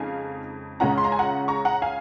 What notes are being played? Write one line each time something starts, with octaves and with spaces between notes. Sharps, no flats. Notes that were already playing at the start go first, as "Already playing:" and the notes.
Already playing: F2 C#3 G#3 D#4 F5 G#5
C#2 C#3 G#3 C#4 F4 F#5 A#5
C6
A#5
G#5
F#5 A#5
A#5 C#6
F#5 A#5
F5 G#5